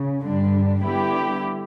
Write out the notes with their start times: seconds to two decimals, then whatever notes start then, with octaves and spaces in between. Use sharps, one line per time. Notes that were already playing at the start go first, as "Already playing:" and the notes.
Already playing: C#3
0.24 G2 D3 G3 D4
0.82 D3 G3 B3 E4 G4